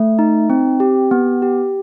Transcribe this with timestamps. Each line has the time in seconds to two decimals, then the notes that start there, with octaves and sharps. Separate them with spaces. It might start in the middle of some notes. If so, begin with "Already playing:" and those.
Already playing: A3
0.19 D#4
0.50 C4
0.80 G4
1.11 B3
1.42 G4